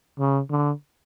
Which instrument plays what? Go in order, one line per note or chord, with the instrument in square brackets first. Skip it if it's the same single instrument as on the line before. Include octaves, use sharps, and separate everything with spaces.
[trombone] C#3
D3